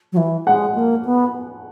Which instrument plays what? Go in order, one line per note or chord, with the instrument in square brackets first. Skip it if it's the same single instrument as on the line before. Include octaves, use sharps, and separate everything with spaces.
[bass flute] F#3
E3
[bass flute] G#3 [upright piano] F#5
[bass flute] A#3
B3